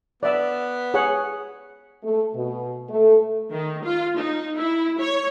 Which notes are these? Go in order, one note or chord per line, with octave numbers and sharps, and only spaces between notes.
B3 D5 E5
G#4 C#5 F#5
A3
B2
A3
D#3
F4
D#4
E4
C#5